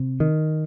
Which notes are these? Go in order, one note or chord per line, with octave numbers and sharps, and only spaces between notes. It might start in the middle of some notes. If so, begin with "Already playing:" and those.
Already playing: C3
D#3